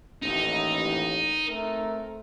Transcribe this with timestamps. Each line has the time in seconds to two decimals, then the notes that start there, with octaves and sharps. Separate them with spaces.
0.23 A1 D#2 D#4
1.46 A3 C4 A#4